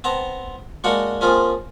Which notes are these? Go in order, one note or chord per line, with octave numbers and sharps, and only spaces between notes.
B3 C4 A5 A#5
G#3 A#3 D4 F#4 C#5 F#5
F3 A#3 C4 C#4 F4 G#4